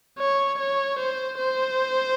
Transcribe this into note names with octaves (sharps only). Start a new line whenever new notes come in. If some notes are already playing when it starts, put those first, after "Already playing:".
C#5
C#5
C5
C5